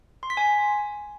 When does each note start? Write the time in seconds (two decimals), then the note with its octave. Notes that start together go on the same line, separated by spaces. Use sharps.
0.23 C6
0.30 B6
0.37 G#5